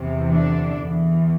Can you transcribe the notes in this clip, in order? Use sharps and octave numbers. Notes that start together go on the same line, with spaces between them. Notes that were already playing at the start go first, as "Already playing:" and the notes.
Already playing: E2 C3 E3
D3 D4
E2 E3